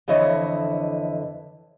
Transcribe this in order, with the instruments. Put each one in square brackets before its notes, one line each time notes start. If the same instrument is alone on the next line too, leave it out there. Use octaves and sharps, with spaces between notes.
[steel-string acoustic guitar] F2 D3 E3 E4 C#5 D#5